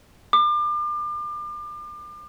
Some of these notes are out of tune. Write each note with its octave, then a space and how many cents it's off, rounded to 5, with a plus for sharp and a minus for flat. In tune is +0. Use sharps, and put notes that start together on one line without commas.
D6 +35